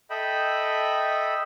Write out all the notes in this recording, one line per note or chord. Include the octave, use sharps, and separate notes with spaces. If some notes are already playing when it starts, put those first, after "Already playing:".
A4 D#5 E5 G5 B5